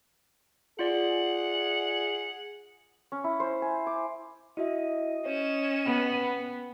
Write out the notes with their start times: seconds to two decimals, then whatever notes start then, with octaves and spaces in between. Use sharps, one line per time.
0.79 F4 G#4 D5 F#5
3.12 C#4
3.24 E4
3.40 C5
3.62 G#5
3.87 D6
4.57 E4 F#4 D#5 E5
5.26 C#4 C#5 E7
5.86 B3 G5